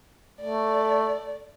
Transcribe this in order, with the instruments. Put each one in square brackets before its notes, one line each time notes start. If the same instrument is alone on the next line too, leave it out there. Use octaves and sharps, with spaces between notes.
[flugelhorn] A3 [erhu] D5